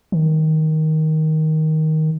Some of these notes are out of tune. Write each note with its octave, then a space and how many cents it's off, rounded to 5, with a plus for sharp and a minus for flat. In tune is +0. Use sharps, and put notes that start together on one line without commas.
D#3 +10